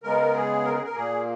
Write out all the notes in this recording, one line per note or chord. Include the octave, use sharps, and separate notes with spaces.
C#3 G#3 B3 A#4
G#4
A#4
G#4
A#4
A#2 A#3 G#4